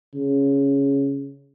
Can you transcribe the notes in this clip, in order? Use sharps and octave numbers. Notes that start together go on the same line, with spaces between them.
C#3